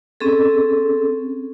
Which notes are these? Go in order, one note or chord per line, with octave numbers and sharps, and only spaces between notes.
C4 C#4 G#4 A4